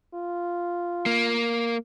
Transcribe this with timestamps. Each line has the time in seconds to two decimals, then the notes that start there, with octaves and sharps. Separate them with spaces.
0.14 F4
1.06 A#3